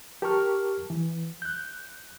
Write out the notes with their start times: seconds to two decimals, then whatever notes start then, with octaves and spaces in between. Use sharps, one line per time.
0.22 G4 A#4 A5 A#5 C#6 F6
0.90 E3
1.42 F#6 G6